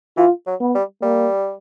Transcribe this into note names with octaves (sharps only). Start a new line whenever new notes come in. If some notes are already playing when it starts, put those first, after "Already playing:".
E3 F4
F#3
B3
G3
G3 A#3